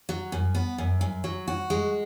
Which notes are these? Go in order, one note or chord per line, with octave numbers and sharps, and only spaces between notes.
F#3
F#2
B3
F#2
F#2
F#3
F#4
G#3